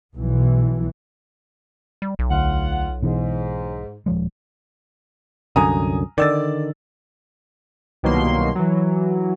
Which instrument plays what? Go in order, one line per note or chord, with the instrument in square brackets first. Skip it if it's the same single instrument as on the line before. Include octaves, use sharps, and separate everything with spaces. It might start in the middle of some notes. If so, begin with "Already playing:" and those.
[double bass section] B1 E3
[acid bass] G3
B1
[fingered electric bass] D2 [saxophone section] F4 F#5
[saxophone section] G#2 [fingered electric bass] B2 E3
[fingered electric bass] D#1 F3 G#3
[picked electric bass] C2 F#2 D3 [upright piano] G#5 A#5 D#6
[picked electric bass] D3 D#3 [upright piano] D5 E6 A6
[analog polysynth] C2 B2 D#3 F#3 A#3 C6
E3 F#3